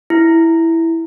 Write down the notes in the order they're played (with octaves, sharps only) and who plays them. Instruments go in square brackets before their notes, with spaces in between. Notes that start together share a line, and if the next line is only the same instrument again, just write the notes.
[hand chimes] E4